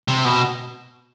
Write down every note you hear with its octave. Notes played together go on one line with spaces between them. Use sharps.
C3
B2